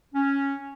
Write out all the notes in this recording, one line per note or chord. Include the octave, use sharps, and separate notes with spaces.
C#4